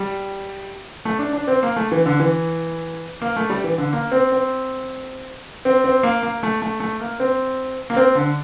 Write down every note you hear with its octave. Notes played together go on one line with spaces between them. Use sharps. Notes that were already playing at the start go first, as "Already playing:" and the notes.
Already playing: G3
A3
D4
D4
C4
A#3
A3
E3
D3
E3
A#3
A3
G3
E3
D3
A#3
C4
C4
C4
C4
A#3
A#3
A3
A3
A3
A#3
C4
A#3
C4
D3